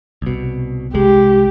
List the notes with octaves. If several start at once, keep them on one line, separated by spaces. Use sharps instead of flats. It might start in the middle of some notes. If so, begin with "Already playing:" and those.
C2 B2
C2 G#3 G4